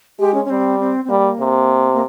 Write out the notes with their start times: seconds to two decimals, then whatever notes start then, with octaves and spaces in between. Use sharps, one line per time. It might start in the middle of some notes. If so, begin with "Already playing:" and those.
0.19 G#3 G4
0.34 C#4
0.45 C#4
0.50 G3 C4
0.79 C4
1.05 C4
1.10 G3 A#3
1.40 C3
1.93 A#3